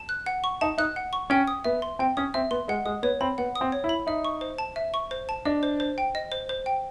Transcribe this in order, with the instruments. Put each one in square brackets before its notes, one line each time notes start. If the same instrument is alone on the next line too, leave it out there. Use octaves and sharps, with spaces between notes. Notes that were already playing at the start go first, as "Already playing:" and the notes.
Already playing: [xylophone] A5
F#6
F#5
C#6
[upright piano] D#4 [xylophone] A5
[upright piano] D#4 [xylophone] F#6
[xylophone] F#5
C#6
[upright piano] C#4 [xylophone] G5
[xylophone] D#6
[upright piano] B3 [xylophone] E5
[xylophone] C6
[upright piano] C4 [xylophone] G5
[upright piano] C#4 [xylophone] D#6
[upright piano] C4 [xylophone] E5
[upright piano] B3 [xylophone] C6
[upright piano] G#3 [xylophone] F#5
[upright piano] G#3 [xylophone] D#6
[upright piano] B3 [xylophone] C#5
[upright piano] C4 [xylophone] B5
[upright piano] B3 [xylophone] F#5
[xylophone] D#6
[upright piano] C4
[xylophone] C#5
[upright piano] E4
[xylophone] B5
[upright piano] D#4 [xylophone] E5
[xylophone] C#6
C5
A5
E5
C#6
C5
A5
[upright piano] D4 [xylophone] D#5
[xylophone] C5
C5
G5
D#5
C5
C5
G5